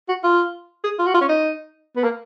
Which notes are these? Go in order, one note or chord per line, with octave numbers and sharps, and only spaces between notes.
F#4
F4
G#4
F4
F#4
F4
C#4
D#4
B3
A#3